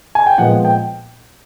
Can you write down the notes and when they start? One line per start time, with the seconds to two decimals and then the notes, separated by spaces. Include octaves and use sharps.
0.15 G#5
0.26 G5
0.38 A#2 F3 G#3 B3 F#5
0.65 G5